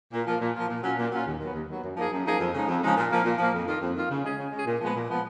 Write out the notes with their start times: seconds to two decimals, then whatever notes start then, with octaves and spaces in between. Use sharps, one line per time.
0.13 A#2
0.27 F3 A#3 F4
0.41 A#2
0.55 F3 A#3 F4
0.69 A#2
0.84 F#3 C#4 F4
0.98 A#2
1.12 F#3 C#4 F4
1.27 D#2
1.40 D#3 F#3 B3
1.54 D#2
1.69 D#3 F#3 B3
1.83 F#2
1.97 F3 A#3 D#4 G#4
2.12 F#2
2.26 F3 A#3 D#4 G#4
2.39 F2
2.54 C#3 F3 G#3 D#4
2.68 F2
2.83 C#3 F3 G#3 D#4
2.97 A#2
3.11 F3 A#3
3.24 A#2
3.38 F3 A#3
3.53 F2
3.67 D#3 A#3 F4
3.81 F2
3.96 D#3 A#3 F4
4.10 C#3
4.24 G#3 C#4 G#4
4.39 C#3
4.52 G#3 C#4 G#4
4.66 A#2
4.81 F3 G#3 B3
4.96 A#2
5.10 F3 G#3 B3